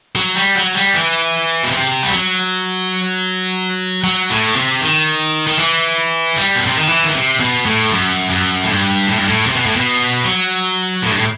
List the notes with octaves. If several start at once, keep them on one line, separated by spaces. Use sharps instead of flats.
F#3
G3
F#3
G3
E3
B2
C3
G3
F#3
F#3
A2
C3
D#3
D#3
E3
G3
B2
C3
D#3
E3
D#3
C3
B2
A2
F#2
F#2
A2
G2
A2
G2
A2
C3
B2
A2
B2
F#3
A2
G2
A2